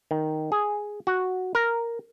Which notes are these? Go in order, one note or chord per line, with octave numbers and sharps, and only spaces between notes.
D#3
G#4
F#4
A#4